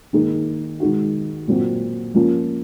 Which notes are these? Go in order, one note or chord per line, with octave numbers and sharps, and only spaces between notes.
D#3 A#3 D#4 G#4
D#3 G#3 D#4 F#4
A#2 F#3 C4 F#4
F3 A#3 C#4 F4